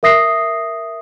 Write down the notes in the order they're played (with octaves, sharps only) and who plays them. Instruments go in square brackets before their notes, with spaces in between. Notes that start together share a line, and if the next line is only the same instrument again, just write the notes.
[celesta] A#4 E5 D#6 A#6 C7